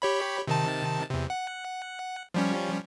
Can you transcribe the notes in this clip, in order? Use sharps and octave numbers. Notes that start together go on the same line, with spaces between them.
G4 C#5 B5
C3 D#3 A5
E2 C3
F#5
F3 G3 C#4